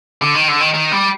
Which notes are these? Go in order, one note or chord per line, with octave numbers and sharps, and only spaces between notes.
D3
D#3
D3
D#3
D#3
G3